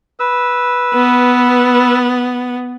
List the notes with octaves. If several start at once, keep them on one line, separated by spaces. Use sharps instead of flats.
B4 E6
B3